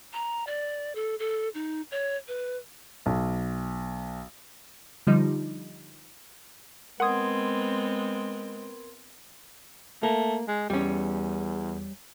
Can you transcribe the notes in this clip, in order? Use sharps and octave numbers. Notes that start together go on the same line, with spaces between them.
A#5
D5
A4
A4
D#4
C#5
B4
B1
D3 F3 G3 D#4
G#3 B3 C4 A#4 F#5 C6 D#6 G#6
A3 A#3
G#3
E2 G3 C#4